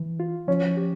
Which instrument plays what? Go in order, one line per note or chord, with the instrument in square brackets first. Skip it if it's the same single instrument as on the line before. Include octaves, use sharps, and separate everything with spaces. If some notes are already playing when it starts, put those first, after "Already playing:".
Already playing: [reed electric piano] E3
F4
[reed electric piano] F3 [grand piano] C#4
[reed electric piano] G4